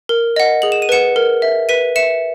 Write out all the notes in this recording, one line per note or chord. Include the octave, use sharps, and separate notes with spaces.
A#4
D#5 F#5
G#4 F#7
E7
D#7
B4 F#5 C#7 E7
A#4
E5
B4 B6 D#7
E5 C#7 E7